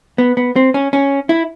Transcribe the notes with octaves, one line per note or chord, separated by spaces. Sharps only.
B3
B3
C4
C#4
C#4
E4